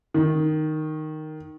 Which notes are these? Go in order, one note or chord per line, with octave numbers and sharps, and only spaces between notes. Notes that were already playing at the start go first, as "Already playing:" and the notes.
D#3